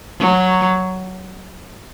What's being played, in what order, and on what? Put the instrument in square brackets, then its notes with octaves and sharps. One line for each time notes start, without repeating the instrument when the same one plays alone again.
[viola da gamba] F#3